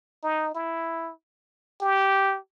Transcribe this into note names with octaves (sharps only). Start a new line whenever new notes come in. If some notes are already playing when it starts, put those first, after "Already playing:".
D#4
E4
G4